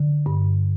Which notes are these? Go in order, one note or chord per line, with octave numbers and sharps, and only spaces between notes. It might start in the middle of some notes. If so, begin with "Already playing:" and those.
Already playing: D3
G2